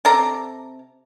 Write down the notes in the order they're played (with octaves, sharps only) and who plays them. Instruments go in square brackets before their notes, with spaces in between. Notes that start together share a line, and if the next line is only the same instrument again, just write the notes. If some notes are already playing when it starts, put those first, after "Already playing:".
[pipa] C3 A4 D5 A#5